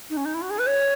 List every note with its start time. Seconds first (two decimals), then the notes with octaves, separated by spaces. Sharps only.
0.10 D#4
0.17 C#4
0.25 D#4
0.34 E4
0.42 F#4
0.50 G#4
0.59 B4
0.66 C#5